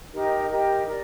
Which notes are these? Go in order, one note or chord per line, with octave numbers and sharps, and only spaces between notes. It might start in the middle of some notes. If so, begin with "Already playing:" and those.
D#4 G4 A#4
D#4 G4 A#4
G4 A#4 D5